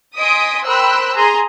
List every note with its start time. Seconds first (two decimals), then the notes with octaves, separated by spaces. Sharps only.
0.17 D#5 G#5 C6 D#6 B6 D7
0.66 A#4 C5 G5 B5 E6 F#6
1.15 G#4 A#5 C6